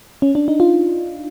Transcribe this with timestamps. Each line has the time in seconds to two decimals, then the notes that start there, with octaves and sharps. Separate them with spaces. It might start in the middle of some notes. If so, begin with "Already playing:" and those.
0.22 C#4
0.35 D4
0.48 D#4
0.60 F4